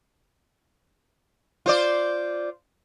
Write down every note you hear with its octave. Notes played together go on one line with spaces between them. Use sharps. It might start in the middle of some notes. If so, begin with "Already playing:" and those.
F4 C5 D5